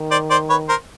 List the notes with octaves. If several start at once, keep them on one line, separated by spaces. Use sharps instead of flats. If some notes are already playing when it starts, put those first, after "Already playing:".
Already playing: D#3
C5 D5
C5 D5
B4 C#5
A#4 C5